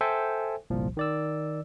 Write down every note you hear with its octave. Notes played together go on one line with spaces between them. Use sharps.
A4 C5 E5 G5 G#5
G1 C2 A#2 F3
D#3 D5 E6